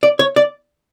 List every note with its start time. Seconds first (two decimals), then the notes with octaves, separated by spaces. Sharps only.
0.03 D5
0.19 C#5
0.36 D5